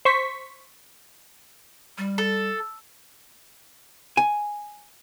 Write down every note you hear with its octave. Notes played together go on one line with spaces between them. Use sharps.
C5 C#6 B6
G3
A4
G#5